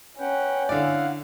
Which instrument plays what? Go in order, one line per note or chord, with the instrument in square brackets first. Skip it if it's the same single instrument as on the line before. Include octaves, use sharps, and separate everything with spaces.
[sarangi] C#4 [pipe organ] B4 F#5 G5
[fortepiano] D3 D5 [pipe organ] E4 F5 F#5